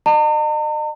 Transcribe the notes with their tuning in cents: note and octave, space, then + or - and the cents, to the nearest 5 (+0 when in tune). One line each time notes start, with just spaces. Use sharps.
D#5 -40 A#5 -45